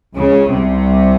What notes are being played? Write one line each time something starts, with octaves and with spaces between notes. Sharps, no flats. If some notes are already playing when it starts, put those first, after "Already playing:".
C#2 C#3
C2 C3